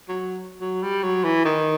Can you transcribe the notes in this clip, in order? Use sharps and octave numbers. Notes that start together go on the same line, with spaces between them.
F#3
F#3
G3
F#3
E3
D#3